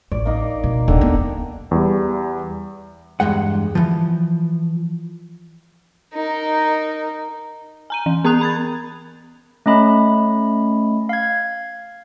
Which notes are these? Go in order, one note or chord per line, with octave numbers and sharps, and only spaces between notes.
A1 D5
A#3 D#4
B2
D#1 D3 D#3
D#2 B3
E2 G3
E2 G2 G#3 F#5
E3 F3
D#4 A#4
G#5 A#5 D#7
E3
B3 A#4 A#5 D#6 F#6 F7
B5 G#6 A6
A3 C#4 D#5 B5
F5 G#6